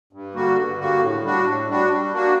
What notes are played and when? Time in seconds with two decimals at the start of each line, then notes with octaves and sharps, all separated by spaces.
0.13 G2
0.34 D3 G3 A#3 F#4
0.57 G2
0.79 D3 G3 A#3 F#4
1.01 A2
1.23 G3 D4 F#4
1.45 A2
1.67 G3 D4 F#4
1.90 G3
2.12 A#3 D4 F#4